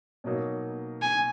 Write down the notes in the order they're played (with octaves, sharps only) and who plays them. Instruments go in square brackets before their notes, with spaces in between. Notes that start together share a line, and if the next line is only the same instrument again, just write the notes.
[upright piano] B2 F#3 A#3 D#4
[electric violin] G#5